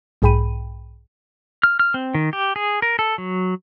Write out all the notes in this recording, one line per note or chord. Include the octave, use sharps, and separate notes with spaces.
B1 G#2 G#4 G5 B5 D#7
F6
F6
C4
D#3
G4
G#4
A#4
A4
F#3